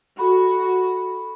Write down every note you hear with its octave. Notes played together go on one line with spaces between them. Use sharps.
F#4 A4 B5